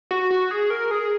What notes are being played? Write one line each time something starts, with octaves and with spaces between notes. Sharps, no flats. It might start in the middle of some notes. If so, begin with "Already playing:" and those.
F#4
F#4
G#4
A#4
G#4